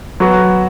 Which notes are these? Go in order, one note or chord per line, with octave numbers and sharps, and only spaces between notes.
F#3 B3 F#4